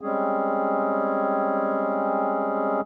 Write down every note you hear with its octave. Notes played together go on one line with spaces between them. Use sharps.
G3 G#3 C4 C#4 G#4